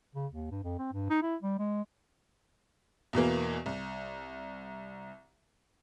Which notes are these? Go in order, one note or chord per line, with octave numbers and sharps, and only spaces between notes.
C#3
D#2
G2
F2
C4
G2
D#4
E4
G3
G#3
E2 B2 E3 A#3
C2